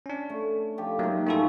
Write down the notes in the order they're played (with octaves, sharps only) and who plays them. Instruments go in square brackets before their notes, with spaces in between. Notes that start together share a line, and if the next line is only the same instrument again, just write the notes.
[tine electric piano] C#4 D4
[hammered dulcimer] A3
F3 G4 A4
[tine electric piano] F#3 A3 A#3 [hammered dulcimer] D#4 A#4
[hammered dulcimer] G#2 F3 C#4 [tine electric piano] A3 E4 A4